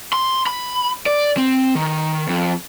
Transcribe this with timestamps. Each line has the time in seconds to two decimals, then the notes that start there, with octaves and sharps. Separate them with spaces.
0.13 C6
0.47 B5
1.06 D5
1.37 C4
1.75 D#3
2.29 F2